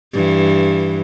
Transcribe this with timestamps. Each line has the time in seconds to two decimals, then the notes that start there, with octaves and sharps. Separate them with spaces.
0.13 G2 E3